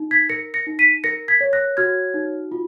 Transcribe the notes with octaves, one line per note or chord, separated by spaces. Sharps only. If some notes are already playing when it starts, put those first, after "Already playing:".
Already playing: D#4
G#6 B6
A#4 A#6 C#7
A#6 C#7
D#4
B6 D#7
A#4 A#6 C#7
G#6 B6
C#5
F#6 A#6
F#4 F6 G#6
D#4
F4